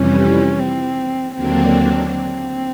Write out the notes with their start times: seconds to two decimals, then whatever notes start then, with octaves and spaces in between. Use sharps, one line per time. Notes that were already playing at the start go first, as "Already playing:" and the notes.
Already playing: F2 C3 E3 G3 C#4
0.59 C4
1.35 D#2 D3 F#3 A#3 C4 D4
2.10 C4